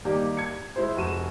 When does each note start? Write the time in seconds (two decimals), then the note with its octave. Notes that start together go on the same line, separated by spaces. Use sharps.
0.05 D#3 G3 A#3 G4 D5
0.37 G#6 C#7
0.76 G#3 E4 C5
0.96 F1 F#4 D#7 E7